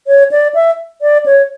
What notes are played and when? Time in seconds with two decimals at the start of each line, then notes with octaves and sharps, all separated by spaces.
0.07 C#5
0.31 D5
0.54 E5
1.02 D5
1.26 C#5